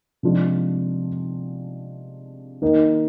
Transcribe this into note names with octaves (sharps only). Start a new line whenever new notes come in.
C3 F3 G#3 D4 F4
D#3 A#3 D#4